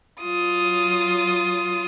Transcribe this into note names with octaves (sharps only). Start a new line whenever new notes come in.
F#3 F4 D#6